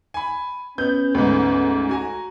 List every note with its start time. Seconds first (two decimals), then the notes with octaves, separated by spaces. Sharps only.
0.14 G#5 B5
0.78 B3 C#4 G6
1.15 D2 G#2 B3
1.89 F#4 G#5 A#5